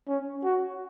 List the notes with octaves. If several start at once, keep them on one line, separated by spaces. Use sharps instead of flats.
C#4
F#4